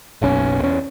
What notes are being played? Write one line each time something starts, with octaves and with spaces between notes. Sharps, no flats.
F#1 B1 B2 C#4
E2 C#4